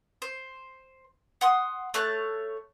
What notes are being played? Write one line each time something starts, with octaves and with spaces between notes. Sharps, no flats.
C5
F#5 C6 D#6
A3 C#5 A5 F#6